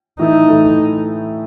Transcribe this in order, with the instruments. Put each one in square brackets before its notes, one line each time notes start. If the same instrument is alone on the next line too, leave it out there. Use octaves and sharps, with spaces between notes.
[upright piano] A2 E3 A3 E4 A4 [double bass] D#4
[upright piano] A2 E3 A3 E4 A4